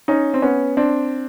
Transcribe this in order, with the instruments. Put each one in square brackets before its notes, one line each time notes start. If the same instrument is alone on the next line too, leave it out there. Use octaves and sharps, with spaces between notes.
[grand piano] C#4 D#4
C4
B3 C#4
C4 D4